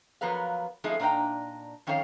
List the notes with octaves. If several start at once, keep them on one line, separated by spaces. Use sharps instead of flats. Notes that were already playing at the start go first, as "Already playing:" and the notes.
F3 F#3 B3 A#4 B4 F5
F3 G#3 A3 C4 D#4 E4
A#2 D4 D#4 B4 G5 A#5
F2 D#3 C#4 A4 C#5 F5